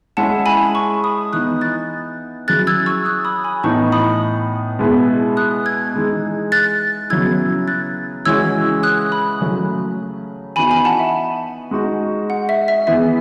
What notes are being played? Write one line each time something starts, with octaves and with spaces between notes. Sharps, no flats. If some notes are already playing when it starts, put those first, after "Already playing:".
G#3 C#4 E4 G#4 F#5 A5
G#5 B5
A5 C#6
B5 D#6
E3 B3 D#4 D#6 F#6
F#6 A6
F#3 C#4 E4 G#4 F#6 A6
E6 G#6
C#6 E6
D#6 F#6
B5 D#6
G#5 B5
A2 E3 B3 D#4 A5 C#6
B5 D#6
B2 G#3 B3 E4 G#4
D#6 F#6
E6 G#6
E3 G#3 D#4 G#4
F#6 A6
C#3 F#3 B3 E4 E6 G#6
F#6 A6
C#3 E3 G#3 C#4 F#4 E6 G#6
D#6 F#6
B5 D#6
C#3 F#3 A3 C#4
E3 B3 D#4 F#4 G#5 B5
G#5 B5
F#5 A5
E5
G#3 D#4 F#4
F#5
E5
E5
E3 B3 E4 G#4 E5